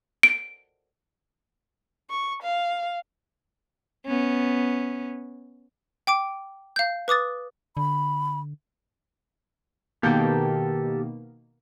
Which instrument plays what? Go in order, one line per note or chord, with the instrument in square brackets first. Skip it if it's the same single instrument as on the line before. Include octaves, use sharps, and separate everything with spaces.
[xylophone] D7
[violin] C#6
F5
[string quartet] B3 C#4
[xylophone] G5 D6 D7
F5 G6
B4 D6 D#6 A6
[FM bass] D3 [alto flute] B5
[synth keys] B2 D#3 A#3 [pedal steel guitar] G4 A4 G5